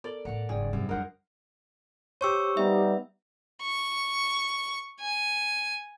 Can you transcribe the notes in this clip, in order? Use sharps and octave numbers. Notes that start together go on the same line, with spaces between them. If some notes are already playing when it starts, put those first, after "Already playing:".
B3 A4 A#4 D5
A2 E3 F#5 A#5
F#1 G#2 G#4 D5 G5 G#5
F#2 C3 G3
D4 E4 A#4 C5 D#5 F#5
G4 C5 C#5 C#6 E6
G3 B3 D#4 E5
C#6
G#5